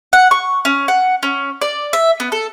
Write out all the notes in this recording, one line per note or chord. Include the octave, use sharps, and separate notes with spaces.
F#5
C#6
C#4
F#5
C#4
D5
E5
B3
A4